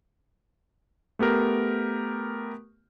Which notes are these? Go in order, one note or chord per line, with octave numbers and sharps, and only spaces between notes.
A3 B3 G4 A#4